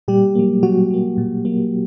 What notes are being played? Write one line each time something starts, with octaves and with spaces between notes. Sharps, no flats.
A#2 G3 G4
F#3 A#3
A#2 F#3 F#4
F#3 A#3
A#2
F#3 A#3